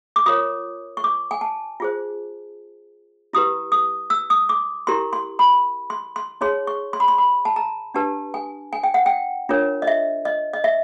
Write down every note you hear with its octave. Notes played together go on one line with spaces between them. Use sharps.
D6
F4 A#4 C#5 D#6
C#6
D6
G#5
A5
F4 G#4 C5
E4 G4 B4 D#6
D#6
E6
D#6
D6
E4 G4 A#4 C6
C6
B5
C6
C6
D#4 G#4 C#5 C6
C#6
C6
B5
C6
B5
A5
A#5
D4 G4 B4 A5
G#5
G#5
G5
F#5
G5
D4 F4 A#4 C#5
D#5
E5
D#5
D#5
E5